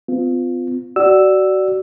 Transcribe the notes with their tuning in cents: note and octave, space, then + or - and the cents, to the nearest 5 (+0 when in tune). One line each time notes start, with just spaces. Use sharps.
C4 -45 F4 +0
F#4 +25 D5 +0 E6 +0